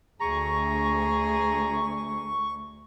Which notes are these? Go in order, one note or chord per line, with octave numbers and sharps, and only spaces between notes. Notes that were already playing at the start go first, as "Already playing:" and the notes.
D2 G#4 A#5 C#6